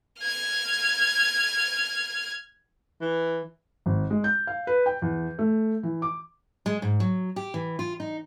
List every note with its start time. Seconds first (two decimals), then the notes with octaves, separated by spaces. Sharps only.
0.21 F6 G#6
3.01 E3
3.86 G#1
4.10 G#3
4.24 G6
4.47 F5
4.67 B4
4.86 G5
5.02 E2
5.39 A3
5.83 E3
6.02 D6
6.66 G#3
6.82 G#2
7.00 F#3
7.36 G4
7.54 E3
7.79 F4
8.00 D#4